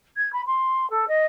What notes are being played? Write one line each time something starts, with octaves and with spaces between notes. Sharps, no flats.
G#6
B5
C6
A4
D#5